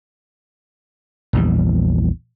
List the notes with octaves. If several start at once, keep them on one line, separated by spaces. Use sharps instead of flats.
A#1 E2 G3